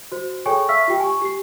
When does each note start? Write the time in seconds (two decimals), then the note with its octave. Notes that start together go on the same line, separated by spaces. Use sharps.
0.12 F#4 C5
0.46 G#4 A4 C#5 G5 G#5 C#6
0.69 E5 F5 C#6 E6 F6 B6
0.88 F4 G4 G5
1.00 G#5 C#6
1.22 G4 C7